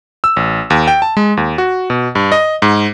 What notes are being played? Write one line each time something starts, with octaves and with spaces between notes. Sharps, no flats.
E6
A1
D#2
G5
A5
G#3
D#2
F#4
B2
G2
D#5
G#2